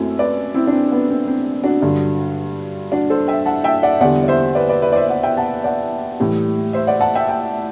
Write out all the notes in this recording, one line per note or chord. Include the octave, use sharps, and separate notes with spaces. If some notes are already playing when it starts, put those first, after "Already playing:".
Already playing: F#2 F#3 A3 C4 E4
B4 D5
C4 E4
D4
C4
B3
C4
C4
D4 F#4
G2 D3 F#3
D4 F#4
A4 C5
E5 G5
F#5 A5
E5 G5
D5 F#5
E2 D3 G3 D5 F#5
D5
C5 E5
B4 D5
B4 D5
B4 D5
D5
C5 E5
D5 F#5
E5 G5
F#5 A5
D5 F#5
A2 E3 G3
C5 E5
D5 F#5
F#5 A5
E5 G5
E5 G5